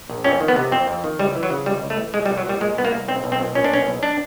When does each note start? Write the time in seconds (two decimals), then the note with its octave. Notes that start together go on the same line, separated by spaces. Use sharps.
0.09 A#1
0.24 F2 C#4
0.40 D#3
0.48 B3
0.56 C3
0.71 F2 C4
0.88 F2
1.04 D#3
1.19 C#2 G3
1.35 E3
1.43 F#3
1.50 C#3
1.66 C#2 G3
1.82 C#2
1.90 A3
1.98 E3
2.14 C2 G#3
2.26 G3
2.30 C2
2.38 F#3
2.45 A#2 G3
2.61 A#2 G#3
2.77 C2 B3
2.85 A#3
2.92 C2
3.08 B1 C4
3.24 B1
3.32 C4
3.40 A#2
3.55 A#2 C#4
3.64 D4
3.72 B1 C#4
3.87 B1
4.03 D4